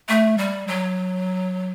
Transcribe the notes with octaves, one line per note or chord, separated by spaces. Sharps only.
A3
G3
F#3